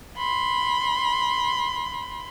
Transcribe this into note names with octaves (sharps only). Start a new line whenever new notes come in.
B5 C6